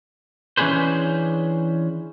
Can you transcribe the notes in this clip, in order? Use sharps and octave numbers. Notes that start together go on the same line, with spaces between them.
E3 C#4 D4 G#4 B4 C5